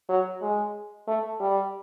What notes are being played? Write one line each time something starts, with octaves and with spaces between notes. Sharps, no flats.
F#3
G#3
A3
G3